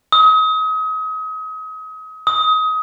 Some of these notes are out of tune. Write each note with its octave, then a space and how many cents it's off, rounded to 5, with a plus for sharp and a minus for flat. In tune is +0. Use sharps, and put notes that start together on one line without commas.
D#6 +35
D#6 +25